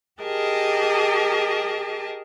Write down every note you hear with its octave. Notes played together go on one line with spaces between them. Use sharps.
G4 G#4 A#4 D#5 A5